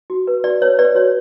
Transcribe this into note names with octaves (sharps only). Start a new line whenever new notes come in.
F#4
B4
F#4 D5
B4 C#5
B4 D5
F#4 C#5